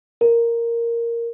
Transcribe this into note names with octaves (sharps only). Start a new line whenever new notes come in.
A#4